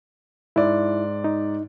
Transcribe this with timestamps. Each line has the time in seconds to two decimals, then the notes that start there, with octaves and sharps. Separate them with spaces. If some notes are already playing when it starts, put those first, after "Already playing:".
0.56 G#2 E4 D5
1.24 D#4